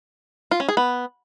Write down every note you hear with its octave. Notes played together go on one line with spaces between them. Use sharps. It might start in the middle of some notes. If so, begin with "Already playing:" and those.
F4
C#4
G#4
B3